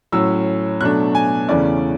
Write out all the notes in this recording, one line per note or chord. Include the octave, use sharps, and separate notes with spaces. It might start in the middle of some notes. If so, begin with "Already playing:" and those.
A2 F#3 C#4 E6
B2 F#3 A3 D4 F#6
G#5
E2 C#3 E3 A3 C#4 D5